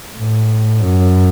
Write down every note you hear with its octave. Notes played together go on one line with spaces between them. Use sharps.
A2
F#2